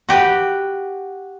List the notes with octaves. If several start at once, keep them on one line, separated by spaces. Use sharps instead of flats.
F#4 G4 B4